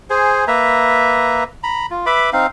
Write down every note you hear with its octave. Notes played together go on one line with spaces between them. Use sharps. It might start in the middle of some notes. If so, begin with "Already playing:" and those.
G#4 C5 G#5
A#3 B4 E5 A#5
A#5 B5
F4
B4 E5 B5 D6
C4 D#4 F5